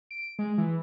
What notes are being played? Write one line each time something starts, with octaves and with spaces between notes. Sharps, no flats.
D7
G#3
E3